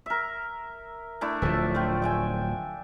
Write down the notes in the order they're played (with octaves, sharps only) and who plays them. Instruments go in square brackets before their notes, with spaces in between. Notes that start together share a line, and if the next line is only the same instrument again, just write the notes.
[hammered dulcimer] A#4 E5
A3 D4 E4
[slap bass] D1 F3 [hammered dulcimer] E5 A5
[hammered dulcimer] A3 F4 G5
E5 G5 G#5